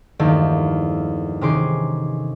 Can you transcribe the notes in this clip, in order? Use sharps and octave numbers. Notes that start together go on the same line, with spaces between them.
E2 G2 D#3 F3 A3 A#3
C3 D#3 C#4 G#4 C6 D6